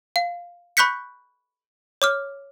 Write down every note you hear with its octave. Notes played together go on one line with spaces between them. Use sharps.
F5
B5 C#6 F#6 G6 B6 C#7
C#5 D6 F6